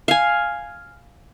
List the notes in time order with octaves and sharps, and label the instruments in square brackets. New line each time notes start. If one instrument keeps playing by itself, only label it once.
[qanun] F5 G#5